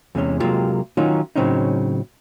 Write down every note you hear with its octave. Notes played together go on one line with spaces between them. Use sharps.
E2 C3 G#3 C#4
C3 F#3 G#3 A#3 F4 G4
D#3 F#3 C#4 D#4 F4
A2 C#3 F#3 C4 C#4 D#4